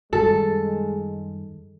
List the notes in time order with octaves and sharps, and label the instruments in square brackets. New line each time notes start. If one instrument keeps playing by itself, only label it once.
[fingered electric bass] F#2 D#3 G3 [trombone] G#3 [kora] A4